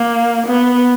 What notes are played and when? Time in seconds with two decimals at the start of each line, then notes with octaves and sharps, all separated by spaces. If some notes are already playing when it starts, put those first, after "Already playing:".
Already playing: A#3
0.47 B3